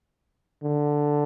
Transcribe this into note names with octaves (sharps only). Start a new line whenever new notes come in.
D3